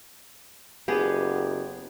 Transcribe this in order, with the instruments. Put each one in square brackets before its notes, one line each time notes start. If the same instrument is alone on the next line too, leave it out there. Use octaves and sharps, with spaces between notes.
[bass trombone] F#1 [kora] B3 G4 G#4